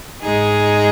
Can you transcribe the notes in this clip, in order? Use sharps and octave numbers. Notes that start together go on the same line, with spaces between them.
G#2 G#3 D#4 G#4